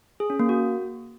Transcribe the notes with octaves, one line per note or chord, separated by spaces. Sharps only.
G#4
C#4
A#3
F#4